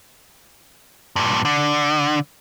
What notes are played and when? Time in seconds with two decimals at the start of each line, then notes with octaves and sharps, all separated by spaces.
1.16 G2 A#2
1.45 D3